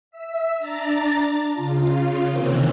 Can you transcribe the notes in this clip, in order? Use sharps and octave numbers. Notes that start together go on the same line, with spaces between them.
E5
D4 A#5 A6
C#3 F4
C3 D#3 E3 A#3 C4 C#4